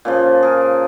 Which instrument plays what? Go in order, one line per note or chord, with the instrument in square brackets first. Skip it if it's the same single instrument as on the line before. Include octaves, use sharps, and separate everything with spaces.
[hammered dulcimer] A#2 C#3 F3
G#4 A#4